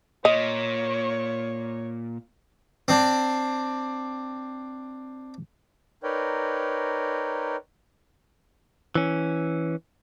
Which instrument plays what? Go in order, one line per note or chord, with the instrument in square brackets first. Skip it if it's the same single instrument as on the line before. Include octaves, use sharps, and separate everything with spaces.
[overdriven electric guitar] A#2 [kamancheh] C#5 [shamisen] D#5
[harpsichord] C4 D4
[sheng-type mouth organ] D#4 A#4 B4 C#5 D5 G5
[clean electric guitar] E3 C#4